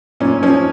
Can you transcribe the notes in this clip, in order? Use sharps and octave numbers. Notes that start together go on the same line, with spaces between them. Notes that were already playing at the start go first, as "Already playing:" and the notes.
A#2 C#4
F3 C#4